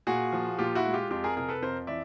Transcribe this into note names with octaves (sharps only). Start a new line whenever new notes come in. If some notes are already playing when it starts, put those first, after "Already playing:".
A#2 F#4 G#4
F3
A#2 F4 G4
E4 F#4
G#3
F4 G4
F2 F4 G4
G#4 A#4
C3 G#4 A#4
A4 B4
F2 A#4 C5
E3 D5 E5